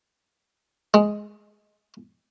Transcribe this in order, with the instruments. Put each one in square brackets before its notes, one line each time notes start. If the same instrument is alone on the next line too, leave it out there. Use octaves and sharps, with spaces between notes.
[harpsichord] G#3